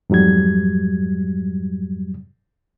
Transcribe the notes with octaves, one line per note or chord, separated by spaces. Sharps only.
F2 G#2 F#3 G3 G#6